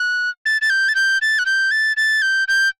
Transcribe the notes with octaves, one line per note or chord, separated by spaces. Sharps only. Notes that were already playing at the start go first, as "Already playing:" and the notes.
Already playing: F#6
A6
A6
G6
A6
G6
A6
F#6
G6
A6
A6
G6
G6